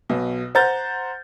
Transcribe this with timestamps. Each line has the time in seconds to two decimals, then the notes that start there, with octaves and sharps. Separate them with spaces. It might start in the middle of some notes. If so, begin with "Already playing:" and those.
0.09 B1 B2
0.55 C5 F#5 A#5 G6 A6